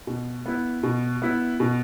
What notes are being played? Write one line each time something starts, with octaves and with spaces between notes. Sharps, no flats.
B2
B3 E4
B2
B3 E4
B2